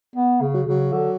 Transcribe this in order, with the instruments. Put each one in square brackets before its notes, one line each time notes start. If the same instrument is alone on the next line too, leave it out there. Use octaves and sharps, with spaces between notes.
[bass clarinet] B3
C#3
[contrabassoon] F#3
[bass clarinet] C#3 [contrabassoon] F#3
[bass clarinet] D3 [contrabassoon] F#3